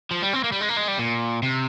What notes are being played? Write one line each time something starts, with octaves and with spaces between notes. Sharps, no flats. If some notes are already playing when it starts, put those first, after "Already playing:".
F3
G3
C4
A#3
G3
G#3
A#3
G#3
G3
A#2
C3